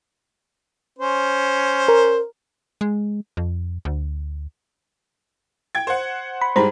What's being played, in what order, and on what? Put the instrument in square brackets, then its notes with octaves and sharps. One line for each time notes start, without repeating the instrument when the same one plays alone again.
[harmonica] C#4 C5
[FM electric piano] A#4
[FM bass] G#3
F2
D2
[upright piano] G5 G#6
C5 F#5
[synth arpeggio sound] B5
[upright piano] G#2 G3 G#3 [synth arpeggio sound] C5 A#5 B5